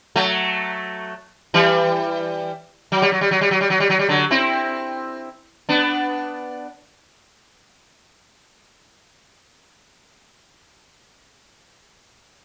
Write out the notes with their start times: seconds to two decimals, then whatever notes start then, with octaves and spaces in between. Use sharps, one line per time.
0.16 F#3 A3
1.54 E3 G3
2.92 F#3
3.02 G3
3.12 F#3
3.21 G3
3.31 F#3
3.41 G3
3.51 F#3
3.61 G3
3.70 F#3
3.80 G3
3.90 F#3
3.99 G3
4.09 D3 F#3
4.31 C4 E4
5.69 B3 D4